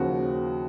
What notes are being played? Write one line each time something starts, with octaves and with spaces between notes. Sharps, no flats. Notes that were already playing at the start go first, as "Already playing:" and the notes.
Already playing: D#2 C#3 F3 F#4